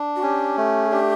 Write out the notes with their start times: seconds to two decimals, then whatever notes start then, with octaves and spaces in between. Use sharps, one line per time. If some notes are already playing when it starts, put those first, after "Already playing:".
Already playing: D4
0.16 F#4
0.22 C#4 G4
0.58 A3
0.86 G#4
0.91 D4 G4